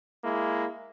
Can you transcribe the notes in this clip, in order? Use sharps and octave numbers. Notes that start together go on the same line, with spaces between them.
G#3 A#3 E4